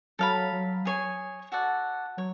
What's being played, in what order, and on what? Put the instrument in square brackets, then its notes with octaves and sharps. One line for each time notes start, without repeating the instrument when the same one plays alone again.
[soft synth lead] F#3 [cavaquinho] A4 F5 B5
[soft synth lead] F#3
[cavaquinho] G#4 C#5 G#5
F#4 A4 D5 F#5
[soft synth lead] F#3 [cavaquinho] C#5